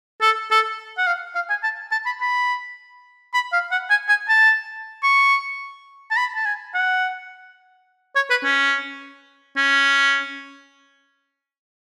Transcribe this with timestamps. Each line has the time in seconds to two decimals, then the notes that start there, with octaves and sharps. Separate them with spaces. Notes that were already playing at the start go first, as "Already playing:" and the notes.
0.21 A4
0.51 A4
0.98 F#5
1.07 F5
1.35 F5
1.50 G#5
1.63 A5
1.92 A5
2.06 B5
2.21 B5
3.34 B5
3.53 F5
3.71 F#5
3.90 G#5
4.09 G#5
4.29 A5
5.03 C#6
6.11 A5
6.17 B5
6.35 A5
6.45 G#5
6.74 F#5
8.15 C#5
8.30 B4
8.44 C#4
9.56 C#4